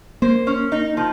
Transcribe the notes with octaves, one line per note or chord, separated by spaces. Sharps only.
A#3 C5
C#4
D#4
F3